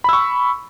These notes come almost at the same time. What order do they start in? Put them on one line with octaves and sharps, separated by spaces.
B5 E6 C#6